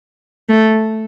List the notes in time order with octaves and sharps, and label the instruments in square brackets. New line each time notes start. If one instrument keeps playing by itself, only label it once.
[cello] A3